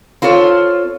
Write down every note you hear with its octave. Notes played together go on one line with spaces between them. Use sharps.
C4 F4 A4 C#5